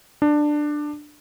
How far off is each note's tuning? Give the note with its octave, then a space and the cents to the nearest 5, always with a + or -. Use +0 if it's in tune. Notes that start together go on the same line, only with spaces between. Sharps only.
D4 +15